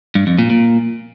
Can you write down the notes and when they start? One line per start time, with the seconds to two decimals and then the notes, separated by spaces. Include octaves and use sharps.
0.15 G2
0.27 F2
0.38 A#2
0.50 A#2